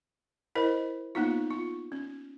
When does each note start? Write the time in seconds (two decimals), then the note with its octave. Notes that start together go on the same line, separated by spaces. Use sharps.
0.55 E4 A#4 C5 D#5
1.15 A#3 B3 D#4 F4
1.51 F4
1.92 C#4